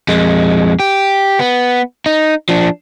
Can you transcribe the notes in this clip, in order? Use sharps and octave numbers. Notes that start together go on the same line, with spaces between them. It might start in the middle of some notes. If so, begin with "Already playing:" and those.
F2 G#3
G4
B3
D#4
F3 D4